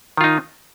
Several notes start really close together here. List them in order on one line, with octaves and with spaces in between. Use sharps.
D#3 F4 D#4